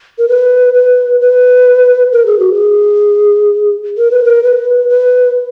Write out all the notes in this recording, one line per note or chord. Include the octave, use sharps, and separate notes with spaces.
A#4
B4
B4
B4
A#4
G#4
F#4
G#4
A#4
B4
A#4
B4
B4